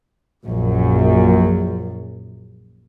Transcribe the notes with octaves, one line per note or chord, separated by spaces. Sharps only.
A#1 F#2